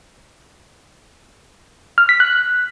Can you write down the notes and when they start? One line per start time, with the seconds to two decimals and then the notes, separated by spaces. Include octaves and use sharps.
1.98 F6
2.09 B6
2.20 F#6